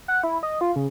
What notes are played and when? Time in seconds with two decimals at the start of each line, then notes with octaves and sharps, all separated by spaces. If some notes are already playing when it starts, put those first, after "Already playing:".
0.08 F#5
0.24 E4
0.43 D#5
0.61 F4
0.76 C#3